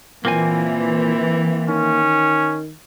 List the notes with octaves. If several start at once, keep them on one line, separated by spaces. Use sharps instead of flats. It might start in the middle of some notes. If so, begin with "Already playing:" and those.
A#2 E3 A#3 C4 G#5
D#3 C#4